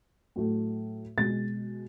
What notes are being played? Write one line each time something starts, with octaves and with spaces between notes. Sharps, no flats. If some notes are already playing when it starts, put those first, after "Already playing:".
A2 F#3 A3
B2 G#3 A6